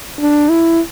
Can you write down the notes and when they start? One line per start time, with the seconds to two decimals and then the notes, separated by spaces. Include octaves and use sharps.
0.20 D4
0.49 E4